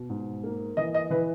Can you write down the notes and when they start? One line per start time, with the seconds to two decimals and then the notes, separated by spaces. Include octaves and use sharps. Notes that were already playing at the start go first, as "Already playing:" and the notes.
Already playing: B2
0.10 G#2
0.44 A#3
0.77 E3 D#5
0.95 D#5
1.11 E3 B4